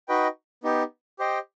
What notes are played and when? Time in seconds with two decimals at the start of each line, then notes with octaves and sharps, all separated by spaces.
0.08 D#4 F#4 B4 D#5 G5
0.63 B3 D#4 G4
1.19 G4 C5 D#5 G5